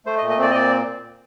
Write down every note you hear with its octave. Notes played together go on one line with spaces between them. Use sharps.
A3 C5
D#5
A#2
D#5
C4 D5
D#5
A#2 D5